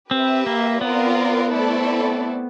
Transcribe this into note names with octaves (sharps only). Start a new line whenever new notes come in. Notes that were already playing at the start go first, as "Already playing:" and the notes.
C4 G4 B4 E5
A#3
B3 C4 F4 A#4 D5
A3 C4 E4 A4 D5